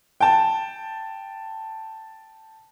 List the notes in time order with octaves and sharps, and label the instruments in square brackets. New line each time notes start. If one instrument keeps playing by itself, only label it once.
[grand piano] G5 A5